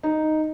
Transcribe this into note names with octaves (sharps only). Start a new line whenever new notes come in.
D#4